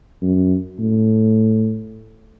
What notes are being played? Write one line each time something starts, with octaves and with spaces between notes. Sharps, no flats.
F#2
A2